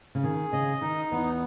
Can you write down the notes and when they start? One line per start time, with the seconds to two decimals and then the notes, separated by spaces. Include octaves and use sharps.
0.15 C#3
0.24 D#3 G#4
0.53 C#3 D#5
0.81 D#3 D#4
1.11 E2 E3 B3